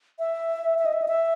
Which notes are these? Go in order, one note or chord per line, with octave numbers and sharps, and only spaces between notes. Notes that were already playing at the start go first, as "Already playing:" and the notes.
E5
E5
D#5
E5
D#5
E5